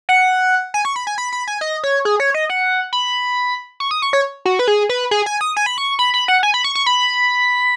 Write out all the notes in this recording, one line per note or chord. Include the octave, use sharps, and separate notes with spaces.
F#5
G#5
C#6
B5
G#5
B5
B5
G#5
D#5
C#5
G#4
C#5
D#5
F#5
B5
C#6
D#6
C#6
C#5
F#4
B4
G#4
B4
G#4
G#5
D#6
G#5
B5
C#6
B5
B5
F#5
G#5
B5
C#6
C#6
B5